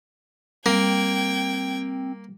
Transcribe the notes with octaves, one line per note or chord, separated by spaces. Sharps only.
G3 A#3 C4 G5 G#6